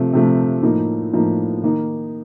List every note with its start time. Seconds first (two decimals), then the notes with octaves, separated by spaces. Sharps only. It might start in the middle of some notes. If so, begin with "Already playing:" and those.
Already playing: C3 F3 A3
0.13 C3 F3 A3
0.63 A2 F3 A#3 D#4
1.13 A2 F3 A#3 D#4
1.63 D#3 A#3 D#4